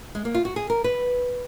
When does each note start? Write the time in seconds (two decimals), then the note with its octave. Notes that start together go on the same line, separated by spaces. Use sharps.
0.15 G#3
0.25 A#3
0.34 F4
0.45 F#4
0.56 G#4
0.70 A#4
0.84 B4